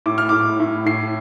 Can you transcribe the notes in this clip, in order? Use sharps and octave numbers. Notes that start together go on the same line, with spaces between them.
A2 D6
F6
A2 D6
A2
A2 C7